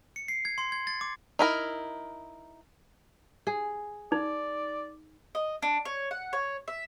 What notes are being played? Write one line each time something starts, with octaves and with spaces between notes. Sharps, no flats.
C#7
C7
G#6
C6
G#6
A6
D6
D#4 E4 A#4
G#4
D#4 D5
D#5
D4
C#5
F#5
C#5
E5